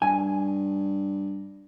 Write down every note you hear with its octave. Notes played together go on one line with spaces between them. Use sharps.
G2 G#5